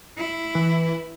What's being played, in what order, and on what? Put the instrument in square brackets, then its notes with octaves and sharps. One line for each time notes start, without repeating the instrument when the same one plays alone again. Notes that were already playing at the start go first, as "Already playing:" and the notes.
[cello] E4
[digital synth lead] E3